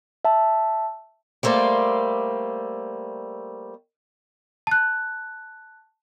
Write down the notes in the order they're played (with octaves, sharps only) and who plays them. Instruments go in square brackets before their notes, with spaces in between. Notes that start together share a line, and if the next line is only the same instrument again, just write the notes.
[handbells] E5 A5
[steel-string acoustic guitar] G3 A3 A#3 C5 D5
[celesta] A5 F#6